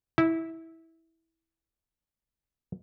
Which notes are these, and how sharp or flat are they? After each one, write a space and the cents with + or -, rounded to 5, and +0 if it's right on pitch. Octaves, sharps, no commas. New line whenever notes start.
E4 -15